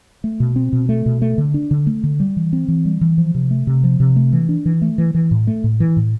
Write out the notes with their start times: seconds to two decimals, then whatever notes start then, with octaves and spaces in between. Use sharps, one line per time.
0.24 A3
0.40 B2
0.56 C4
0.72 B2
0.89 A3
1.06 B2
1.22 A3
1.38 D3
1.54 D4
1.71 D3
1.87 A3
2.03 D3
2.20 G3
2.37 E3
2.53 C4
2.68 E3
2.85 G3
3.01 E3
3.18 F3
3.35 C3
3.51 A3
3.67 C3
3.84 F3
4.00 C3
4.16 A3
4.33 E3
4.49 D4
4.66 E3
4.82 A3
4.98 E3
5.14 E3
5.31 A2
5.47 A3
5.64 A2
5.80 E3
5.97 A2